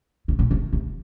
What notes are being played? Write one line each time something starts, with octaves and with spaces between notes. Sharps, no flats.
C3
B2
C3
C3